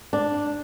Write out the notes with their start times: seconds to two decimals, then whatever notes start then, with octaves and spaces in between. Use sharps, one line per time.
0.13 D4